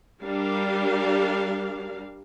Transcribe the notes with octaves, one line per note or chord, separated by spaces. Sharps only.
G3 D4 A#4 F5